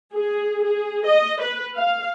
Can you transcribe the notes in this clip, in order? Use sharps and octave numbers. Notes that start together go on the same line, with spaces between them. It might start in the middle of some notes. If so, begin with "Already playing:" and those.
G#4
G#4
D#5
B4
F5